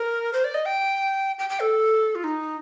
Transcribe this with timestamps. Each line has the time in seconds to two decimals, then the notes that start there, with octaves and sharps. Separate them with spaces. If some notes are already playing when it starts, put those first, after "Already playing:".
Already playing: A#4
0.33 C5
0.44 D5
0.54 D#5
0.66 G5
1.39 G5
1.50 G5
1.60 A4
2.15 F4
2.24 D#4